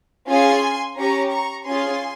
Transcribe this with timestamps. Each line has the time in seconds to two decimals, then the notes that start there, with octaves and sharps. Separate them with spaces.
0.29 C#4 F4 G#4 G#5 C6
0.98 C#4 G4 A#5 C#6
1.32 A#5 C#6
1.66 C#4 F4 G#4 G#5 C6